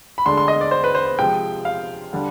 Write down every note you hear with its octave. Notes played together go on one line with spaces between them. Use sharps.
B5
D2 D3 G#3 D4 C6
C6
D#5
D5
C5
B4
C5
C3 F3 G#3 G5
F5
D3 G3 D4